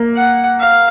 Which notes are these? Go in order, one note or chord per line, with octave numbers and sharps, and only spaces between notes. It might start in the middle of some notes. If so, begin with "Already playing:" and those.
Already playing: A#3
F#5
F5